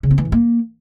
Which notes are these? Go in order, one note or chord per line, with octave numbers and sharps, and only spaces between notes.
C#3
C4
E3
A2
A#3